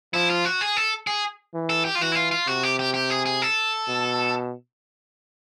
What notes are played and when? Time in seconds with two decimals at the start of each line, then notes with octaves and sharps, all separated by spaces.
0.13 F3 E4
0.30 F4
0.45 F#4
0.61 G#4
0.77 A4
1.07 G#4
1.54 E3
1.70 A4
1.85 G4
1.95 F4
2.01 E3 F#4
2.12 E4
2.16 F4
2.31 F4
2.47 C3 F#4
2.63 G4
2.79 G4
2.94 G4
3.10 G#4
3.26 G#4
3.42 A4
3.88 B2